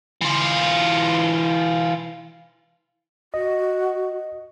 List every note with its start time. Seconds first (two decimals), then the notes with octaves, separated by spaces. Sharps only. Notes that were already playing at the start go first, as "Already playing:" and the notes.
0.21 E3 F4
3.34 F#4 D#5